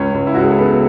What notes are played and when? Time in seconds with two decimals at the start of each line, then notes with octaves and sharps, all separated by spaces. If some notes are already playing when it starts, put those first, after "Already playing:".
Already playing: C#2 C#4 C#5
0.15 C#2
0.27 E4
0.34 C#2 F#4
0.43 G#4
0.50 A4
0.58 C#3 B3 B4